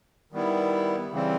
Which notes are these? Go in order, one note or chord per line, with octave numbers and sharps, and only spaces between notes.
D#3 G3 B3 E4
C#3 E3 G3 C4